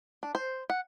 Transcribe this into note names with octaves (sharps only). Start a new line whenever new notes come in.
D4
C5
F#5